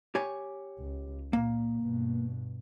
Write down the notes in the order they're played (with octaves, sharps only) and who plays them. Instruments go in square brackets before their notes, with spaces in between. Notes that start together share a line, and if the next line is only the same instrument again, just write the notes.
[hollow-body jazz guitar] G4 C#5 G#5
[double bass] C#2
[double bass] A#2 [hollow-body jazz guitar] A#3
[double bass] G2 B2